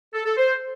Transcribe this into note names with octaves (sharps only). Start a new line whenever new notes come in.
A4
A4
C5